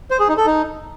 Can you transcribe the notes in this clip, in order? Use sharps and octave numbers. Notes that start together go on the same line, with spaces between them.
C5
G#4
D#4
A4
D#4